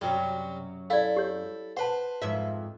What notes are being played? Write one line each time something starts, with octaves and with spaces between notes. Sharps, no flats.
F#2 C3 F#3 G3
E4 A4 D5 F5
G4 C#5
B4 C5 F#5 A5
F2 G#2 E5